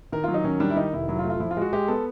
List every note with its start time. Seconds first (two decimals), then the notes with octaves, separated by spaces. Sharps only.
0.12 D#3 A#4
0.24 F#3 F4
0.34 D#4
0.44 D#3 C#4
0.60 G3 D4
0.70 E4
0.76 D#3 D#4
0.93 F1 E4
1.08 F#3 E4
1.19 F4
1.24 A3
1.30 F4
1.40 F3 E4
1.51 F4
1.57 G#3 F#4
1.73 G#3 G4
1.88 B3 A4